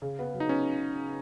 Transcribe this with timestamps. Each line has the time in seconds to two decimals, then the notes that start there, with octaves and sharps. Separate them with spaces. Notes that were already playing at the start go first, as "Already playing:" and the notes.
0.02 C#3
0.19 B3
0.33 F#3
0.40 D#4
0.49 B3 C#4